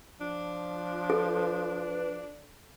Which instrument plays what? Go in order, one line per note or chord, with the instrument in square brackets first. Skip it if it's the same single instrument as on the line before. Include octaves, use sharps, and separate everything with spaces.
[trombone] F3 [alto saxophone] D4
[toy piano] A4 [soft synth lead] B4